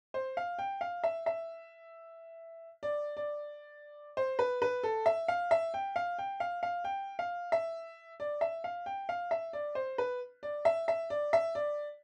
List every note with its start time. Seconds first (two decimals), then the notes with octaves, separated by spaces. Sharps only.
0.14 C5
0.37 F5
0.59 G5
0.81 F5
1.04 E5
1.26 E5
2.83 D5
3.17 D5
4.17 C5
4.39 B4
4.62 B4
4.83 A4
5.06 E5
5.28 F5
5.51 E5
5.74 G5
5.96 F5
6.19 G5
6.40 F5
6.63 F5
6.84 G5
7.19 F5
7.52 E5
8.20 D5
8.41 E5
8.64 F5
8.86 G5
9.09 F5
9.31 E5
9.53 D5
9.75 C5
9.98 B4
10.43 D5
10.65 E5
10.88 E5
11.10 D5
11.33 E5
11.55 D5